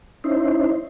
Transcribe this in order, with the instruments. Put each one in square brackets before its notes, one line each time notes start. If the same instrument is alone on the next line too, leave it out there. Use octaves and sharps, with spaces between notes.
[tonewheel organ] C#4 D#4 E4 C5